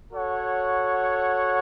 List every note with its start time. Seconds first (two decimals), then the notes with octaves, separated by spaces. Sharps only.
0.11 F#4 A4 C#5 F#5